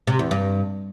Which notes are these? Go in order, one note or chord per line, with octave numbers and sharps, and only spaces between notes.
C3
E2
G2